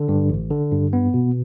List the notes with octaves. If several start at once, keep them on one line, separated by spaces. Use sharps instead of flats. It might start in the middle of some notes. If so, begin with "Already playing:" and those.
Already playing: D3
G2
A1
D3
G2
B3
B2